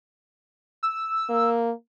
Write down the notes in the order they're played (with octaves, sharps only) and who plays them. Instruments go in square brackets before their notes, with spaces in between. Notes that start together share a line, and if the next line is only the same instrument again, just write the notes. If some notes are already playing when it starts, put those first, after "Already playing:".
[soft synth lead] E6
[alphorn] A#3